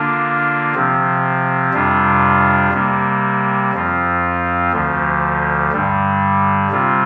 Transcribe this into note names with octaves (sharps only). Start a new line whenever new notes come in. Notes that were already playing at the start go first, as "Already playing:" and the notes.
Already playing: D3 A#3 D4 F4
C3 F3 C4
F2 C3 G3 D4 F4
C3 G3 A#3
F2 F3 C4 F4
D2 D3 F3
G2 D3 G3
C3 G3 C4 F4